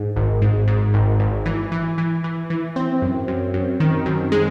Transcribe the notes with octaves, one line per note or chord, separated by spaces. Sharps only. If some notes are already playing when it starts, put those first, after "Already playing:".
Already playing: G#2
G#1
G#2
G#2
G#1
G#1
E3
E3
E3
E3
E3
C4
F#2
F#2
F#2
D#3
F#2
G#3